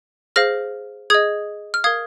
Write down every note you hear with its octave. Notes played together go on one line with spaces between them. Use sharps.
G#4 C5 F5 F6 A#6
G#4 D#5 D#6 G#6
F6
A#4 F5 D#6 G#6